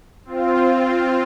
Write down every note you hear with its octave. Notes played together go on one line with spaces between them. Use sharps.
C4 F4